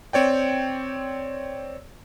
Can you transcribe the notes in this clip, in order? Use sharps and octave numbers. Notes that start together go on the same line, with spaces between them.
C4 C#5 D5 G5